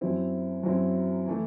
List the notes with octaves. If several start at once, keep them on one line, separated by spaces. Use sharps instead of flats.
F#2 F#3 C4 E4
F#2 F#3 C4 E4
E3 A3 E4